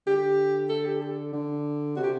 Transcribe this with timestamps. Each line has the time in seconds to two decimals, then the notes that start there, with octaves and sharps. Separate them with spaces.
0.07 D3 G4
0.69 A4
0.86 G4
1.02 A4
1.33 D3
1.96 C3 F#4
2.04 G4